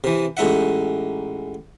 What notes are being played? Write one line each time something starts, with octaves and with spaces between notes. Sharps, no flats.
C3 E3
A1 G#3 D#4 E5 F#5